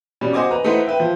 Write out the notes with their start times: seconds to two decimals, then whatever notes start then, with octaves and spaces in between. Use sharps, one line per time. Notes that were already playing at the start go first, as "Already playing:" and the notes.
0.21 B2 G3 C#4
0.33 F#4 C5 D#5 G#5 D6
0.51 B4 D#5 A#5
0.64 A3 D#4 E4 B4 C5 F#5
0.87 B4 E5 G5
1.00 F3